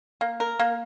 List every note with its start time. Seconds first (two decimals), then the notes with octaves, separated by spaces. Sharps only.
0.21 A#3
0.40 A#4
0.59 A#3